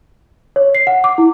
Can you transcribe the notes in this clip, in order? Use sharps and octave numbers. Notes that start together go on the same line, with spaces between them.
C#5
C7
F#5
D6
E4